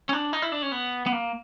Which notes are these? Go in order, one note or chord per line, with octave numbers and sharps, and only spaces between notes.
C#4
D4
D#4
E4
D4
C#4
B3
B3
A#3